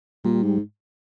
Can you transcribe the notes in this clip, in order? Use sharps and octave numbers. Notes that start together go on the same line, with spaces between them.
A#2 G3
G#2